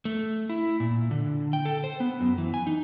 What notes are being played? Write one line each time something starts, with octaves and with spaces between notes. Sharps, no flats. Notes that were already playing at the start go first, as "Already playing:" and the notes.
A3
E4
A#2
D3
G5
A4
C5
B3
F#2
E3
G#5
D#4